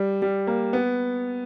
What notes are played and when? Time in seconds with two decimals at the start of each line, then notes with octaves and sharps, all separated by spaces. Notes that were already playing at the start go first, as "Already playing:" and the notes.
Already playing: G3
0.22 G3
0.47 A#3
0.73 B3